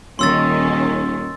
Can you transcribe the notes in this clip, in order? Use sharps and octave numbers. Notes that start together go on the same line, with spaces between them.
D#1 D#3 C#4 C6 E6 A6